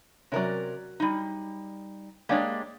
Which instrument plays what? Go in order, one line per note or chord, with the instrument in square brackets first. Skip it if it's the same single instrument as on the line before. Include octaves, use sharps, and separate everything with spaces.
[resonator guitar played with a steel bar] C3 A#4 D5 [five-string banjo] F#3 C#4
[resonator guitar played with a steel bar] G3 D#4
[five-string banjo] G#3 D4 G4 [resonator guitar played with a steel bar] A#3 C#5 D5